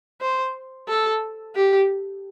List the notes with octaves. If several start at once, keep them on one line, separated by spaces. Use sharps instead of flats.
C5
A4
G4